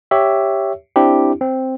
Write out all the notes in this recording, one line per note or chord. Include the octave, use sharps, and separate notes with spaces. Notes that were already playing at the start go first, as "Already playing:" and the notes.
G4 C#5 E5
C4 D4 E4 G4
C4